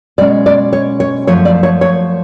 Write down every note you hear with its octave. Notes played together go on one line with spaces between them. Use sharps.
B2 G#3 C#4 D5
D5
C#5
C#5
F#2 F3 A3 C#5
D5
C#5
C#5